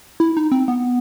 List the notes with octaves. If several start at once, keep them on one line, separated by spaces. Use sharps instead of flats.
E4
D#4
C4
B3